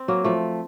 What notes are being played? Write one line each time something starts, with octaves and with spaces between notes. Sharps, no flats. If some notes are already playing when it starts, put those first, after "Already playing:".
Already playing: C4
F#3 A#3
F3 A3